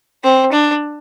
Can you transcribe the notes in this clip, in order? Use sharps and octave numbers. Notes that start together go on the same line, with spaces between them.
C4
D4